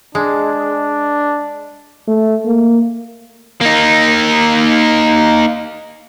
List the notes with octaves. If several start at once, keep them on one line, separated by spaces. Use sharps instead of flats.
G#3 D4
A3
A#3
A#3 D#4